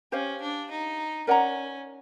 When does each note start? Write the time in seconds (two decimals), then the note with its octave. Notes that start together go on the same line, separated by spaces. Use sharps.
0.12 C#4 G4 C5 F5
0.41 D4
0.71 D#4
1.27 C#4 A#4 D5 F#5 A#5